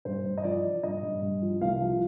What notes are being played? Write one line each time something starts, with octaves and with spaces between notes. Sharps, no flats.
G2 C5
G2
D#5
F3 D5
F3
G2 D#5
G2
G2
F3
C2 F5
F3